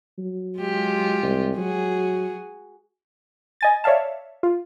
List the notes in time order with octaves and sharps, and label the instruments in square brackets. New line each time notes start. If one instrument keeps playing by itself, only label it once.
[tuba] F#3
[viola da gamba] G#3 F4 G4
[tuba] C2
[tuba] F#3 [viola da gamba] F#4 G#4
[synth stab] D#5 G#5 A6
C#5 D5 E5 F5 A5
F4